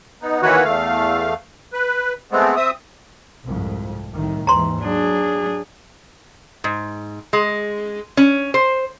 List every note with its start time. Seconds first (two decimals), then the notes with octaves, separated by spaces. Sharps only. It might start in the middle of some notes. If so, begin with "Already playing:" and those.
0.22 B3 D#4
0.42 D#3 E3 A#3 F#4 B4 C#5
0.64 E2 A3 F5
1.73 B4
2.32 G#3 A3 B3 C4
2.56 C4 E5 D#6
3.45 C2 F2 G#2
4.13 C2 A2 D#3
4.47 D#2 G#2 E3 A#5 C6
4.82 F#3 D4 G#4
6.64 G#2
7.33 G#3
8.17 C#4
8.54 C5